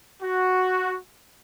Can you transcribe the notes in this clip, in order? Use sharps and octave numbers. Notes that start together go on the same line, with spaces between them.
F#4